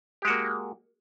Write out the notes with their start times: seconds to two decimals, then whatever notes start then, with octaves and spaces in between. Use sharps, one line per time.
0.22 G4
0.25 G#3
0.27 F#4
0.30 A#3